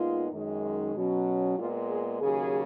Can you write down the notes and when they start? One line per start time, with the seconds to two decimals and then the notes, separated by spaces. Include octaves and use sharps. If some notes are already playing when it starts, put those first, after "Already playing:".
Already playing: A#2 G#3 B3 D#4 F4
0.32 F#2 D#3 G#3
0.95 B2 F#3 C#4
1.58 A#2 G#3 B3 F4
1.89 G#4
2.20 D#2 C#3 F#3 G#4